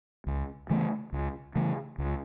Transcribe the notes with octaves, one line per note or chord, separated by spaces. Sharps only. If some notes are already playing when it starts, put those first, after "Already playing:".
C#2
C#3 E3 A3
C#2
C#3 E3 A3
C#2